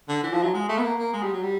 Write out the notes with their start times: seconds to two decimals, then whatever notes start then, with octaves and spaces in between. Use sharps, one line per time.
0.08 D3
0.23 E3
0.33 F3
0.43 F#3
0.54 G#3
0.69 A3
0.78 B3
0.83 A#3
0.99 A#3
1.13 G#3
1.23 G3
1.33 F#3
1.43 G3